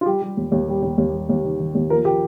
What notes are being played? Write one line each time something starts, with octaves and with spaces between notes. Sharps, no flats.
F4
G3 G4
G3
D#2
D#2
G3
D#2
D#2
G3
D#2
D#3
D#3
D#2
F3 A#4
F3 G4